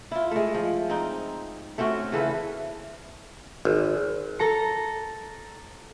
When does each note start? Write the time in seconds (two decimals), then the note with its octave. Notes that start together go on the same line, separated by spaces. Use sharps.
0.11 E4 F4
0.31 G#3 A3
0.54 F3
0.90 C4 D#4
1.78 A3 C4 C#4 F#4
2.12 C#3 E3 A4 B4
3.65 G#1
4.39 A4 A#5 C#7